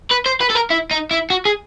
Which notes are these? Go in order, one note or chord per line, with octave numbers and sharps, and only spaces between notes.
B4
C5
B4
A4
A#4
E4
D#4
E4
F#4
G#4